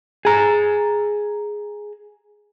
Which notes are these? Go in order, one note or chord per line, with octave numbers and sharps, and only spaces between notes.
G#4 A#5